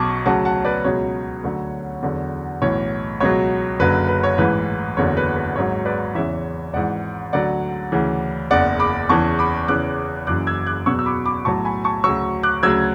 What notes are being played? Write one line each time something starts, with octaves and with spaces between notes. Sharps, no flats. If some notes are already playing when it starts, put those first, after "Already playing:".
Already playing: B1 B2 F#3 A5 C#6 D6
D2 C#3 F#3 F#5 A5
F#5 A5
B4 D5
C#2 B2 F#3 C#5
D2 D3 F#3
E2 D3 F#3
B1 A2 E3 C#5
C#2 B2 F#3 C#5
F#1 F#2 D3 F#3 B4
B4
C#5
A1 G#2 E3 B4
F#1 E2 D3 F#3 C#5
B4
B4
G#1 G#2 F#3 C#5
B4 D5
E2 C#3 E3 C#5 E5
G#1 G#2 E3 D5 F#5
D2 D3 F#3 D5 F#5
D2 C#3 E3
F#1 E2 C#3 D5 F#5
B5 D6
E2 C#3 E3 A5 C#6
B5 D6
E2 C#3 E3 D6 F#6
F#1 F#2 E3 D6 F#6
E6 G#6
D6 F#6
E2 B2 F#3 C#6 E6
E6
B5 D6
B5 D6
B1 A2 F#3 A5 C#6
G#5 B5
A5 C#6
D2 C#3 F#3 C#6 E6
D6 F#6
D2 C#3 F#3 E6 G#6